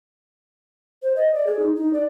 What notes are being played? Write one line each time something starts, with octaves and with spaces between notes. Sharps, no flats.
C5
D#5
D5
G#4
D#4
D#4
D5